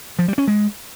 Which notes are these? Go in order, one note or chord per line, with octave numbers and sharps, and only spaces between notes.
F3
G3
C#4
G#3